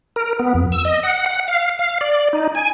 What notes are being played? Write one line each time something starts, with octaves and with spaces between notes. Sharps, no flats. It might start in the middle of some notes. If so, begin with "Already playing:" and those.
A#4
B3
F2
E6
D#5
F#5
F#5
F5
F5
D5
D#4
G#5